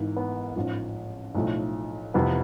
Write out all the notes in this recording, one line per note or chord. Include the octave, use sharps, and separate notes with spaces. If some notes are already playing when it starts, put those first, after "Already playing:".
Already playing: G#1 G#2 E3
B3
A1 G#2 F3
B1 A2 F3 A3
F1 F2 C3 E3 B3